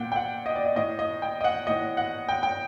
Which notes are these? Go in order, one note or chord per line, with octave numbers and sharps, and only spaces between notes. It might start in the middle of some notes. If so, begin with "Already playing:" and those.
Already playing: A#2 F#5 G5
G5
F#5
D#5
D5
D#5
A2 D#5
D#5
G5
D#5
F#5
A2 D#5
F#5
G5
G5